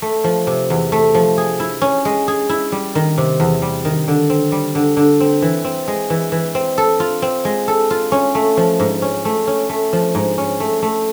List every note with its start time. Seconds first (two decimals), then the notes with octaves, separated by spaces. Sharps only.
0.02 A3
0.24 F3
0.47 C3
0.70 E2
0.92 A3
1.15 F3
1.38 G#4
1.60 E4
1.82 C#4
2.05 G#3
2.28 G#4
2.49 E4
2.72 G3
2.95 D#3
3.18 C3
3.40 E2
3.62 G3
3.85 D#3
4.08 D3
4.30 C4
4.52 G3
4.75 D3
4.97 D3
5.20 C4
5.42 E3
5.65 C4
5.88 G#3
6.10 E3
6.32 E3
6.55 C4
6.78 A4
7.00 F4
7.22 C4
7.45 G#3
7.68 A4
7.90 F4
8.12 C#4
8.35 A3
8.57 F3
8.80 G#2
9.02 C#4
9.25 A3
9.47 C#4
9.69 A3
9.93 F3
10.15 G#2
10.38 C#4
10.60 A3
10.82 A3